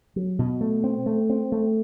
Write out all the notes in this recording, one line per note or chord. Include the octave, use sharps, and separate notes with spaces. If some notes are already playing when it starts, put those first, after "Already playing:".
F#3
B2
A3
C4
A3
C4
A3